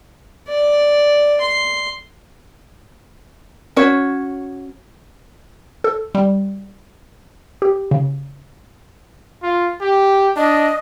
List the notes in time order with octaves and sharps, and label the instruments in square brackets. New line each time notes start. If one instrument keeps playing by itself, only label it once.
[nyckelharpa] D5
C6
[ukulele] C#4 F#4 C#5
[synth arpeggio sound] A4
G3
G4
C#3
[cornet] F4
G4
[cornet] D4 [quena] D#5